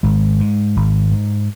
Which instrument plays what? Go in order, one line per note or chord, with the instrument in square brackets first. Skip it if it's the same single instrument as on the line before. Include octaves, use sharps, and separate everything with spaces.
[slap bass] G#1 G#3
G#2
G#1
G#2